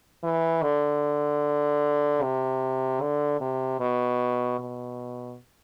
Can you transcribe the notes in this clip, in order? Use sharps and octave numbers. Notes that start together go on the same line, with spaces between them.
E3
D3
C3
D3
C3
B2
B2